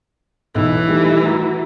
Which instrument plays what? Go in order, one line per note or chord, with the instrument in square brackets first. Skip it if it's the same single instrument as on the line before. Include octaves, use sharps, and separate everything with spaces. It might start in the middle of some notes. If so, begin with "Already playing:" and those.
[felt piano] B1 E6 [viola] E3
[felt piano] D#3 G3 A3
F#4 A#5